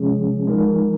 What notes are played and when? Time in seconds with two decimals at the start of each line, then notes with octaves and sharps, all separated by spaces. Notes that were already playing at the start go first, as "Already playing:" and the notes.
Already playing: C3 F3 G#3 C#4 G#4
0.47 F3 G#3 D#4 A#4